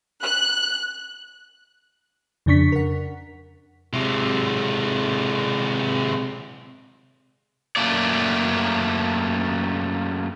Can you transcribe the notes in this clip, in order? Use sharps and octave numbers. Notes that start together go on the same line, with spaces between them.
F#6
F2 C#3 D4 C#6 B6
A#4 F#5
C3 G#3
F#2 C#3 A3 A#3 D5